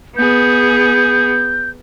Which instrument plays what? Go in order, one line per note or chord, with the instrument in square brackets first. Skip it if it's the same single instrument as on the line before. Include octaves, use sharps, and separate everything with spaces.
[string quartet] B3 G#4 [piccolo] G6